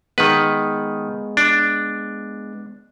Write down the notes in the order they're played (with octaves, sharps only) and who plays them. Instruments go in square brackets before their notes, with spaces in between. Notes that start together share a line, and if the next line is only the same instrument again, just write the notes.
[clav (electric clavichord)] D#3 B4 [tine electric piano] G#3 B3
[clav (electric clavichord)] D4